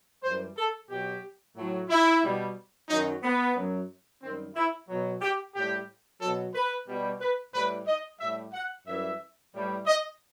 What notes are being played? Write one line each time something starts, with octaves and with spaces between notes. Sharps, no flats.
F#2 E3 G3 C5
A4
B2 F#3 G4
A2 F#3
E4
B2 G3
F#2 D#3 F#3 D#4
B3
F#2 F#3
F#2 D#3 G3 C4
E4
B2 F#3
G4
A2 G3 G4
B2 F#3 A4
B4
B2 G3
B4
A2 E3 G3 B4
D#5
A2 G3 E5
F#5
F#2 E3 G3 E5
A2 E3 G3
D#5